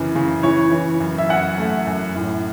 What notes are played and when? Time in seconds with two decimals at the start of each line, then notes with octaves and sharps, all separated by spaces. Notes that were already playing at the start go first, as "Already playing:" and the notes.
Already playing: F#2 C#3 E3
0.15 C#3
0.43 E3 C#5
0.72 E3
1.00 F#2
1.18 E5
1.29 F#2 F#5
1.58 A3
1.87 F#2
2.15 A2